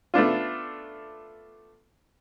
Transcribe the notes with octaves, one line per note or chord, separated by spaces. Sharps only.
A3 B3 D4 F4